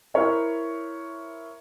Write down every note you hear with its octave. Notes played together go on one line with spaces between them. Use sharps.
E4 A#4 C5 C#5 E5